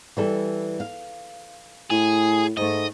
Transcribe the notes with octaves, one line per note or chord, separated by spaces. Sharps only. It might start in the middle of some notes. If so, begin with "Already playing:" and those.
E3 G3 A4
F5
A2 G#4
G#2 A3 D#5